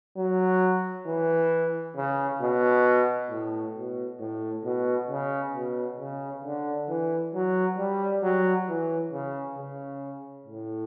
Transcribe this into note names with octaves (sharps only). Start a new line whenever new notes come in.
F#3
E3
C#3
B2
A2
B2
A2
B2
C#3
B2
C#3
D3
E3
F#3
G3
F#3
E3
C#3
C#3
A2